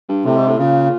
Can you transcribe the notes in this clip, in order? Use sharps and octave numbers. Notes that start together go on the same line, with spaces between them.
G2
A2 C3
G#2
A2
A#2 C#3